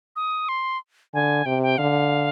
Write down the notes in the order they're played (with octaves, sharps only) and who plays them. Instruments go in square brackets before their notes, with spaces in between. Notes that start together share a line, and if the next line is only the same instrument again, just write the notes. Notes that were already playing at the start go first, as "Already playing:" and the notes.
[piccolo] D#6
C6
[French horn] D3 [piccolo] G#5
[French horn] C3 [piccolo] G5
[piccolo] G5
[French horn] D3 [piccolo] F5